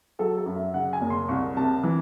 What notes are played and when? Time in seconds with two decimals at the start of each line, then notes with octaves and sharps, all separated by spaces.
0.19 F#3 A4
0.38 A4
0.46 F#2
0.56 E5
0.74 C#3 F#5
0.93 G#5
1.01 F#1
1.10 C6
1.29 C2 C#6
1.57 C3 A5
1.84 E3